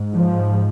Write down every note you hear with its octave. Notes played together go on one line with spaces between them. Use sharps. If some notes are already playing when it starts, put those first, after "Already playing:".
Already playing: G#2
F3